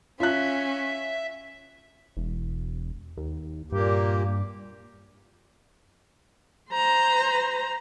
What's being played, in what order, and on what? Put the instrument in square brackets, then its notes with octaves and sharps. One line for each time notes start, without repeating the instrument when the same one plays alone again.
[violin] C#4 [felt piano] F4 F#6 [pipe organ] E5
[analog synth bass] E1
D#2
[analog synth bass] G2 [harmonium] A#2 A#3 G4
[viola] C5 A#5